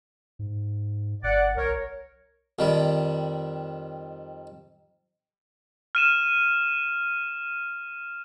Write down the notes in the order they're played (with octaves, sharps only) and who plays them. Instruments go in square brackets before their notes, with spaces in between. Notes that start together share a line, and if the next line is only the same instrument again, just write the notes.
[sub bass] G#2
[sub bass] G1 [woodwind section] D5 F#5
[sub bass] B1 [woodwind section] A#4 C#5
[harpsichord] F2 D#3 G3
[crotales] F6 D#7 E7